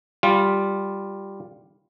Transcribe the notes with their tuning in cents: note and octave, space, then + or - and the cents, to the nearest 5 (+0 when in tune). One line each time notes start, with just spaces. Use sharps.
G3 +0 F4 +0